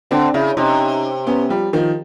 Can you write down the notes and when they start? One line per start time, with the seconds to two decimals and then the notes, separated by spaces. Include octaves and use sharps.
0.11 D3 C4 D4
0.34 C#3 D4 E4
0.57 C3 C#4 D#4
1.27 B3 C#4
1.49 F3 G3
1.73 D#3 F3